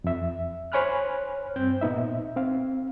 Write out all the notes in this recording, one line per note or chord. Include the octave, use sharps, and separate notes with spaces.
F2 E5
C5 C#5 G#5 B5 F6 F#6
G2 C4 G6
A#2 B3 D#4 E5
C4 F5